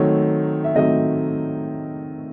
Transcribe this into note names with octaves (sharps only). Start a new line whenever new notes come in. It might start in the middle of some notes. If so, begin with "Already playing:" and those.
Already playing: D#3 F#3 A3 C4 C#5
E5
D#3 F#3 A3 C4 D#5